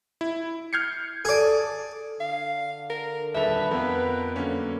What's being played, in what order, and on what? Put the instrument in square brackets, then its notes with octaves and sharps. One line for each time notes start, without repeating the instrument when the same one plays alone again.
[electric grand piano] E4
F6 G6 G#6 C7 C#7
[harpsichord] G#4 D5 [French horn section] A4
[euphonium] D3 [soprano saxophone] F5
[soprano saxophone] A#4
[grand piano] D#1 A4 F7 [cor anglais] B4 [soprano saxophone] E5
[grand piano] F2 [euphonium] B3 [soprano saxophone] A#4
[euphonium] F#2 [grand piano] D3 A#3 C#4